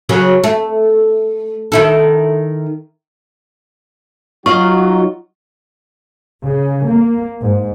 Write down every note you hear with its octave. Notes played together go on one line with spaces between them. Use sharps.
C#3 F#3 A#3
A3
D#3 E4 A4
F#3 D#4 F4 F#4 D#5 F5 C#6
C#3
A#3
G#2